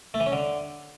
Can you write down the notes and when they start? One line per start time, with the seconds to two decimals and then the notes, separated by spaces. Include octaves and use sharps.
0.14 A3
0.20 E3
0.26 C#4
0.32 D3